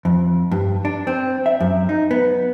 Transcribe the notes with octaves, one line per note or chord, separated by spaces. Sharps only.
F2
G2
D4
C4
E5
F#2
D#4
B3